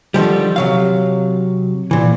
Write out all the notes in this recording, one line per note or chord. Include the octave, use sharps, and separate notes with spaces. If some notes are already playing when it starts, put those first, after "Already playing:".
D3 D#3 F3 G3
C3 F#3 F5
A#2 E3